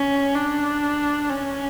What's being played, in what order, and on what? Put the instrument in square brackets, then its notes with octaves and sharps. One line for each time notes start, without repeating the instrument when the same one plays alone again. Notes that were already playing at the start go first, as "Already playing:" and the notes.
Already playing: [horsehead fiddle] C#4
D4
C#4